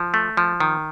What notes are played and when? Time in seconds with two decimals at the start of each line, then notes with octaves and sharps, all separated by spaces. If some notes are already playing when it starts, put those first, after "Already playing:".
Already playing: F3
0.14 A3
0.37 F3
0.60 D#3